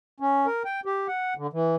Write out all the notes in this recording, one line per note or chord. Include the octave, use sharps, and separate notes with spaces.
C#4
A#4
G5
G4
F#5
D3
E3